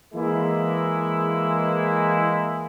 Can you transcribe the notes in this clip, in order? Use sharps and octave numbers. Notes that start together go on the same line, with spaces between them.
E3 G#3 A#3 E4